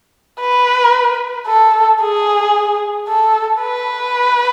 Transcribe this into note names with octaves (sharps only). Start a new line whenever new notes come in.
B4
A4
G#4
A4
B4